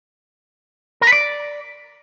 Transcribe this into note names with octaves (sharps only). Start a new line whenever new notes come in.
A#4
B4
D5